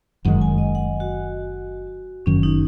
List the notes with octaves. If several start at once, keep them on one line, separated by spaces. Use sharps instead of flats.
F#1 F#2 D#3 G#3 F#5
G#5
D#5
F#5
F#4
F#1 F#2 D#3 F#3 C#4
D#4